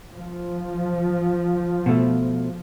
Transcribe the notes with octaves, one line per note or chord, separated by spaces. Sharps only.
F3
B2 A3